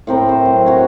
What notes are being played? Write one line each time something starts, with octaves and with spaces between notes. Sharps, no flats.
A2 C4 A#4
C5
F#3
F#4 C#5